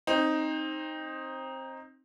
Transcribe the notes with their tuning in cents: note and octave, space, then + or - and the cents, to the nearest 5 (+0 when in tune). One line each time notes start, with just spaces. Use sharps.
C4 +20 D#4 +0